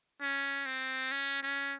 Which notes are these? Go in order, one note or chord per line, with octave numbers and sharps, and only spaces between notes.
C#4
C4
C#4
C#4